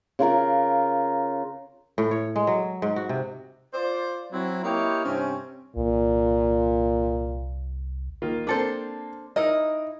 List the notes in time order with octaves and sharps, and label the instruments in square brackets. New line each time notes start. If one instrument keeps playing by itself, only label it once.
[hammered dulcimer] C#3 F4 A#4 F5
[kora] A2
C#5
G#3
F#3
G#2
F#4
C3
[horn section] F4 C5 D5
F#3 C4 E4
A#3 E4 G4 C#5 D#5 G5
G2 C3 C4 C#4
[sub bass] C2 [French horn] A#2
[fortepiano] D#3 A#3 F4
[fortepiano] A#3 C4 [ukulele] D4 A4 C5
[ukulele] D#4 E4 D#5 [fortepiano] A#4